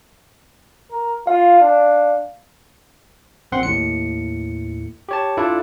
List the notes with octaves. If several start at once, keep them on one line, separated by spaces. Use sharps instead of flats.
A#4
F4 F5
D4
A#1 C4 F#5 C6
D#2 A2 C#7
G4 C#5 A5
D4 E4 F4 A4 D5